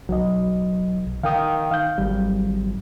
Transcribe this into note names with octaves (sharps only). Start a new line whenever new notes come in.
B1 F#3 D#5
D#3 F5 G5 D#6
F5 G6
G#1 F#3 G3